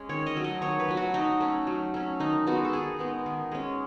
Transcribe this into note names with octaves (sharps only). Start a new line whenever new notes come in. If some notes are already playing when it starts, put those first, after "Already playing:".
Already playing: G#3 C#4
D#3 C#5
D#5
F#3 A3
D#5
D#3 C#5
B4
F#3 A3
F#4
F#3 D#4
A3 C#4
F#3
A3 C#4
D#3 D#4
G#3 B3 D#4 F#4
A4
D#3 G#4
G#3 B3 D#4
D#3
G#3 C#4